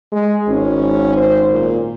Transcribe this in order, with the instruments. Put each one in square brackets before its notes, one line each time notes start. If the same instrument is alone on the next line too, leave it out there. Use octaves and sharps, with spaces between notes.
[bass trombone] G#3
[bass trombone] G#1 [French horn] C#4
[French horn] C5
A#2